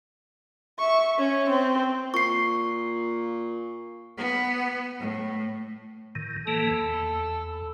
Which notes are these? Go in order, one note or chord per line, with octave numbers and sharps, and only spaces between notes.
E5 C#6
C#4
C4
A#2 C#6 C7
B3
A2
A2 D#3
E3 A#3 A4
E2